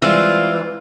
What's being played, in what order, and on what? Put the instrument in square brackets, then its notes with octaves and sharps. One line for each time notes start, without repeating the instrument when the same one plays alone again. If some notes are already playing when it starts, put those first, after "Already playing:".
[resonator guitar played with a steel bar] E3 [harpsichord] G3 G#3 C4 [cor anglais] F4